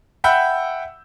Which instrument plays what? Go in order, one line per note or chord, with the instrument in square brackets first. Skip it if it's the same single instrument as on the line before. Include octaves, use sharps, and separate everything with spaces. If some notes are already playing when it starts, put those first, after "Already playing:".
[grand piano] E5 F#5 G5 B5 E6 G6